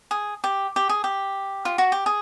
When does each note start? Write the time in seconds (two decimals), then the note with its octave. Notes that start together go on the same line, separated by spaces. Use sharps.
0.11 G#4
0.44 G4
0.76 G4
0.89 G#4
1.04 G4
1.65 F4
1.78 F#4
1.92 G4
2.06 G#4